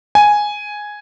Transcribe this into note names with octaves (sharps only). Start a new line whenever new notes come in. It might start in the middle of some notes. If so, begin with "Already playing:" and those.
G#5